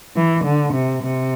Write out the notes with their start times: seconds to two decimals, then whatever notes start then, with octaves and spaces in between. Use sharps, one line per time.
0.16 E3
0.45 D3
0.74 C3
1.03 C3